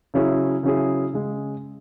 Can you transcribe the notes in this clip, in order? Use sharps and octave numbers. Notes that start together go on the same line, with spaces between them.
C#3 F#3 C#4 E4 G#4
C#3 F#3 C#4 E4 G#4
C#3 G#3